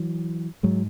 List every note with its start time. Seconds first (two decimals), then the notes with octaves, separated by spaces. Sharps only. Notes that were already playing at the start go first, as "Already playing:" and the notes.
Already playing: E3 F#3
0.63 G#2 F#3 G#3